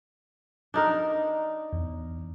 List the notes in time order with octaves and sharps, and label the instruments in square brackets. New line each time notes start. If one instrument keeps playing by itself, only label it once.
[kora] D4 D#4 A#4
[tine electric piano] E2